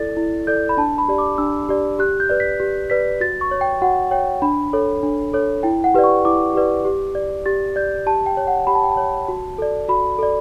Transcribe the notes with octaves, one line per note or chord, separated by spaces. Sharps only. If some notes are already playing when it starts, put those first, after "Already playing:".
Already playing: E4 A4 D5 A6
E4
A4 D5 G6
B5
D4 A5
B5
G4 D5
D6
D4 E6
G4 D5
G4 F#6
G6
B4 D5
B6
G4
B4 D5 B6
F#4 A6
C#6
C#5
G5
F#4 F#5
C#5 G5
D4 B5
A4 C#5
D4
A4 C#5
E4 G5
F#5
G4 B4 D5
C#6
E4 D6
G4 B4 D5
G4
D5
G4 A6
D5 G6
G4 A5
G5
C#5
F#5
G4 B5
A5
G5
A5
C#5
F#4
A4 D5
F#4 B5
A4 D5